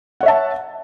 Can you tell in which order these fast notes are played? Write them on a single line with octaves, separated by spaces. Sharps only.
F#5 C#5 E5 A5